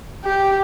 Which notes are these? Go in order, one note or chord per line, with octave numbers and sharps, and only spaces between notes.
G4